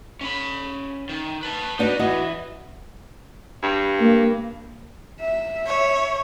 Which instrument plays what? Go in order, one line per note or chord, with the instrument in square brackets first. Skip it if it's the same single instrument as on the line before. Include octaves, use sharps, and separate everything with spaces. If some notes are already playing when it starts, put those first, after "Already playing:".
[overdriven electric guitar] C#4 B5
D#3
B4 A5
[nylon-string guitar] B3 D4 F#4 [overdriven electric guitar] D#4
[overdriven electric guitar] E3 [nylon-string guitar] B3 F#4 D#5
[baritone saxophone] G2
[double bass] A#3
[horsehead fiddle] E5
[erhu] C#5